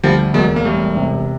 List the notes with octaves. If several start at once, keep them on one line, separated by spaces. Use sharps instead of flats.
D2 F3 G3
E1 F#3 G#3
A#3
E1 G3 A3
C3